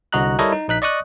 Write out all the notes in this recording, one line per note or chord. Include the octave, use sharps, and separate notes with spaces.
C2 D3 F#4 D#5 A#5 F#6
G3 E4 A4 A#4 C#5 D#5
D#4
A#1 D#4 F#6 B6
D5 D#5 C#6 D#6 F#6